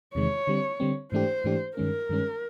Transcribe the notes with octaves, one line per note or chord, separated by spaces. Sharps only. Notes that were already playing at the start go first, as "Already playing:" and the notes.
E2 C3 D#3 G#3 C#5
D3 G3 C4
D3 G3 C4
G#2 E3 A3 D4 G4 C5
G#2 E3 A3 D4 G4
G2 D#3 G#3 C#4 A#4
G2 D#3 G#3 C#4